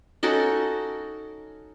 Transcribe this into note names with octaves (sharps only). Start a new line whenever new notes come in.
C#4 D#4 F#4 A4